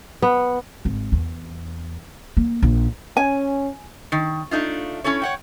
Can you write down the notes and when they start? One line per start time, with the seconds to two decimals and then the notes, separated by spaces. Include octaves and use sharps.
0.22 B3
0.85 G#1
1.12 E2
2.37 A#3
2.62 A#1
3.17 C#4 G#5
4.12 D#3
4.51 A3 D4 D#4 F4
5.04 C#4 E4 A4 C#5
5.22 C#5 F#5 G5